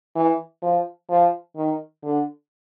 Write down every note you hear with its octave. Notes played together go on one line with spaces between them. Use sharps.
E3
F3
F3
D#3
D3